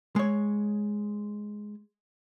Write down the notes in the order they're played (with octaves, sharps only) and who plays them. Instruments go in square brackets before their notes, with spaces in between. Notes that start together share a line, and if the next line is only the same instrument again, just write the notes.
[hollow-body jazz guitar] G#3 C#5